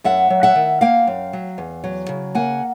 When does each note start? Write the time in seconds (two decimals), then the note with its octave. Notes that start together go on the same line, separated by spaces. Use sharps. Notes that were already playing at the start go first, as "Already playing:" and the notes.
0.04 F#2 E5 F#5
0.30 F#3
0.43 E5 F#5
0.55 D#3
0.81 A#3 F5 G5
1.07 F#2
1.33 F#3
1.58 E2
1.84 F#3
2.09 C#3
2.35 A#3 F#5 G#5